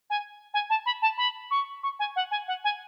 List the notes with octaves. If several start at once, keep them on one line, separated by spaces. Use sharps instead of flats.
G#5
G#5
A5
B5
A5
B5
C#6
C#6
G#5
F#5
G#5
F#5
G#5